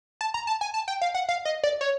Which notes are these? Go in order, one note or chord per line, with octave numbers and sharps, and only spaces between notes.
A5
A#5
A5
G#5
A5
G5
F5
F#5
F5
D#5
D5
C#5